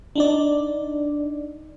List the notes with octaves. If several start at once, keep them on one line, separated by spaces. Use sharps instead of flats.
D4 D#4 D5